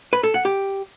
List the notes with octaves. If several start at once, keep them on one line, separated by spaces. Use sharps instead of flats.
B4
A4
F#5
G4